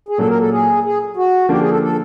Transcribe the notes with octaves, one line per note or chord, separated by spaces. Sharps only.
G#4
A#2 F#3 A#3 A4
A#4
A4
G#4
G#4
F#4
D3 F3 A#3 D4 G4
G#4
A4
A4